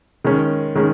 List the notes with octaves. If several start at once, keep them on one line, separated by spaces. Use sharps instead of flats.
D#3 G#3 C#4
D#3 G#3 C#4